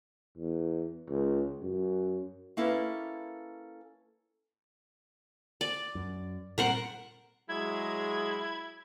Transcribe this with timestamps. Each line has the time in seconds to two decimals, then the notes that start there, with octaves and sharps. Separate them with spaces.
0.38 E2
1.09 C#2
1.62 F#2
2.57 A#3 C#4 E4 A4 B4 E5
5.61 D5
5.95 F#2
6.58 A#2 G3 C4 A#4 C5 F#5
7.49 F#3 G#3 E4 G#4 G#6